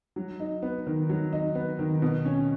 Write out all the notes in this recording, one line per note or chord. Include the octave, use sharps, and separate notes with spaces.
F#3
D#4
B3
D#3
F#3
D#4
B3
D#3
B2
C#4